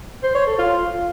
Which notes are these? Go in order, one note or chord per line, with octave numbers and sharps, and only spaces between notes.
C5
C#5
A4
F4